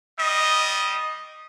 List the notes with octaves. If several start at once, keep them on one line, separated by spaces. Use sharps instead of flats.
G3 D#5